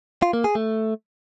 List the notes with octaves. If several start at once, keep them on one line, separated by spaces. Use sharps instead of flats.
F4
A#3
G#4
A3